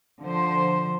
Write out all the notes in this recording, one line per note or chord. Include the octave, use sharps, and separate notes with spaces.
D3 F3 C5